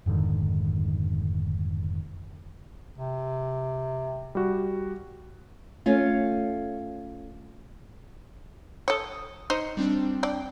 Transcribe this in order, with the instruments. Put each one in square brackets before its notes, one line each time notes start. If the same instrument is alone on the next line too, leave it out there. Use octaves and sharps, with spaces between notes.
[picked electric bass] F1 G#2 D3 D#3
[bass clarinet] C3
[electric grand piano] G3 F#4
[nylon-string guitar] A3 C#4 F4
[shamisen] A4 C#5 [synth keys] D#6
[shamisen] D#4 C5 [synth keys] C#7
[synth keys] G3 C4 D4
[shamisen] D4 D5 [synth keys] G5